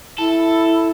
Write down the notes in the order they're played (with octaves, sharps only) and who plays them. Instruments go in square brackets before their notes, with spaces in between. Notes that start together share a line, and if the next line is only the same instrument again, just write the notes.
[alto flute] E4 [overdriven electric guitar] A4